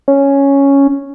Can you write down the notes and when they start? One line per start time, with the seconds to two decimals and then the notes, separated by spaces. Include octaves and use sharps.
0.08 C#4